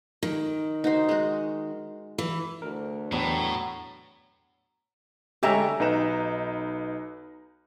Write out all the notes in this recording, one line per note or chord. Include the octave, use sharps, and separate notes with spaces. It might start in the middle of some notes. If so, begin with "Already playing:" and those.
D#3
D#4 F#4 C5
G#3 F#4
E3
D2 A#4
E2 A2 F#3 B3 D4 G5
D3 G#3 C#4 G4 E5 A#5
B1 D#4 B4 A#5 E7